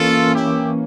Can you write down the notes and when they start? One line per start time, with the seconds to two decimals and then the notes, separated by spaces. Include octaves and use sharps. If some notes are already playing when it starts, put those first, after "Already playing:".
Already playing: E3 A#3 C#4 F4 A4
0.35 E4 G4